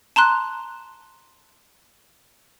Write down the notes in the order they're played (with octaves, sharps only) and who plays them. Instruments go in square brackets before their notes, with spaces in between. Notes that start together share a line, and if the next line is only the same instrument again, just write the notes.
[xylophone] A5 A#5 C6 F#6